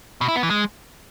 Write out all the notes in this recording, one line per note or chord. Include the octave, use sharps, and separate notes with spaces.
B2
E4
B3
E3
G#3